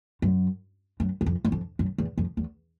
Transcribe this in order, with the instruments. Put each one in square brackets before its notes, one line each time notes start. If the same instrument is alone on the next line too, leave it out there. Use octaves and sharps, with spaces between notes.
[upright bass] F#2
F#2
E2
F2
F#2
F2
F#2
E2
F2
E2